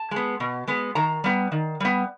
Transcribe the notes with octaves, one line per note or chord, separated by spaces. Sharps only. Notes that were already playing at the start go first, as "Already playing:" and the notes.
Already playing: A5
G#3 B3
B2
G#3 B3
D#3 A#5
G3 B3
D#3
G3 B3